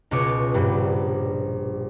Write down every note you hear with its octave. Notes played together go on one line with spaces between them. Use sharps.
C#2 B2 F4 C#5 D6
A#1 G2 G3